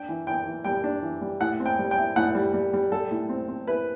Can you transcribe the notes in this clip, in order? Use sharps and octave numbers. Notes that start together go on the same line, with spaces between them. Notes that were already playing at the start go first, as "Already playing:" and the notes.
Already playing: D4 G5
E3
E3 G5
E3
G3 G5
D4
E3
G3
A2 F#5
C4
G5
G3
G5
E4
A2 F#5
G3
G3
G3
G3 A4
A2
C4
C4
E4 B4